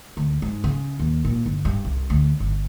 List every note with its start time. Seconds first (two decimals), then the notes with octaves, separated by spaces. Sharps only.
0.17 D2
0.42 G#2
0.64 C#3
1.00 D#2
1.25 A#2
1.46 G1
1.65 G2
1.85 C2
2.10 D2
2.40 G1